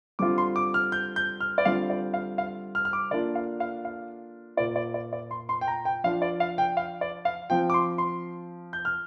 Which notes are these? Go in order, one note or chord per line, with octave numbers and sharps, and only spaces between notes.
D3 G3 C4 F4 D6
C6
D6
F6
G6
G6
F6
D5
D3 G3 C4 F4 F5
D5
F5
F5
F6
F6
D6
D3 A#3 D4 F4 D5
F5
F5
F5
A#2 A#3 F4 D5
D5
D5
D5
C6
C6
G5
A#5
G5
F3 D4 F4 F5
D5
F5
G5
F5
D5
F5
F3 C4 F4 G5
D6
C6
C6
G6
F6